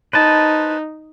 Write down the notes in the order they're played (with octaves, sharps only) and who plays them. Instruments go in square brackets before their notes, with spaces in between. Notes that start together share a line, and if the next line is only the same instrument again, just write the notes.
[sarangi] D#4 [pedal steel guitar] B4 C5 A5